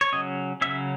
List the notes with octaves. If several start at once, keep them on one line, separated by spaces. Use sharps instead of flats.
C#5
C#3 F#3 C#4 D#5
C#3 F#3 C#4 E5